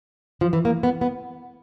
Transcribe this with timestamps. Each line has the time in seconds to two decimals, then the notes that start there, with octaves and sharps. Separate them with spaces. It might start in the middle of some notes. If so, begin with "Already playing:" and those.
0.41 F3
0.53 E3
0.65 A#3
0.83 B3
1.01 B3